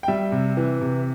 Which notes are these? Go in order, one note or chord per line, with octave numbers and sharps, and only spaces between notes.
G5
G3 E5
C3
E3
C3